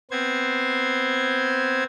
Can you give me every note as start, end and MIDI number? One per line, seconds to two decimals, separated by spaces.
0.11 1.83 59
0.11 1.83 60
0.11 1.83 72
0.11 1.83 92